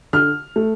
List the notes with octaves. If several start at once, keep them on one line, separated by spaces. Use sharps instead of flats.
D3 F6
A3